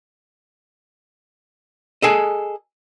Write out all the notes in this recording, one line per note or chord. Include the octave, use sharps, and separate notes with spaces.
G#4 A4 D#5